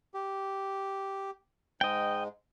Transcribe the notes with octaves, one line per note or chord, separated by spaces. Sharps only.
G4
G#2 G#3 D#5 G5